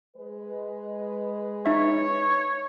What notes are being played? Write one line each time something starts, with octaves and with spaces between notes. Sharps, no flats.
G#3 B4
D#4 C#5 E5